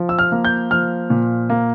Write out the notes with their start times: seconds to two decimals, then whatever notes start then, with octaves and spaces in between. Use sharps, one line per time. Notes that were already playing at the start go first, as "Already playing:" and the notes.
Already playing: F3
0.09 E6
0.19 F6
0.32 A#3
0.45 G6
0.71 F3 F6
1.10 A#2
1.50 A#3